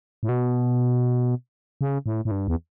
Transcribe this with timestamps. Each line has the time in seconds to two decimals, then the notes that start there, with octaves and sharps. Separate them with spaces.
0.23 A2
0.29 B2
1.81 C#3
2.06 A2
2.25 A2
2.31 G2
2.48 E2